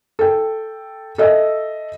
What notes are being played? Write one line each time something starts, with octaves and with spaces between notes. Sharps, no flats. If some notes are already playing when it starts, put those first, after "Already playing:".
A4 G5
A4 D#5 E5